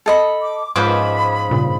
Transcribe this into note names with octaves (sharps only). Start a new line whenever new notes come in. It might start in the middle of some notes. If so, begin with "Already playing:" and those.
A4 D#5 B5
D6
G#2 F3 C#4 F4 B4 C5 B5 D6
G2 A#2 C#3